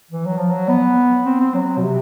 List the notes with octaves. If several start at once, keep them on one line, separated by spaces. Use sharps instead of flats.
E3
F#3
F3
F#3
B3
C4
C4
F#3
B2
C3